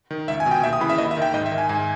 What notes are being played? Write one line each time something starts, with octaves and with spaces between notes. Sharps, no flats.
D#3
C#2 E5
G#5
B2
G5
D#2 E5
D#6
C#3 E3 B5
E5
D#2 D#5
E5
D#3 G5
G#2 D#5
E5
D#3
G#5
G#2 G#5